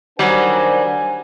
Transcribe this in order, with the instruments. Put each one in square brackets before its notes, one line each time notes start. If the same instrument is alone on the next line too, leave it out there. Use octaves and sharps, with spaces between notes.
[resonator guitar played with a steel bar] D#3 F#3 G3 [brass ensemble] D4 C5 F#5 [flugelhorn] G#5